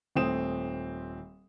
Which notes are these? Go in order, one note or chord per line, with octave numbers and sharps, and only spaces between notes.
D#1 A3 C4 D#6 E7